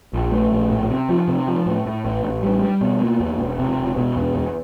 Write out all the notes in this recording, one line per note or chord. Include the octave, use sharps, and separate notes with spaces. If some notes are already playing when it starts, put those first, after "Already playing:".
A#1
A3
A#1
A2
C3
F3
C3
F3
A2
A2
A1
A1
G3
G3
B2
A#3
E2
E1
C3
E1
B2
E2
E2